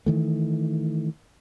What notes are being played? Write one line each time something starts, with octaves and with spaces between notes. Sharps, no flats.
D#3 E3 A3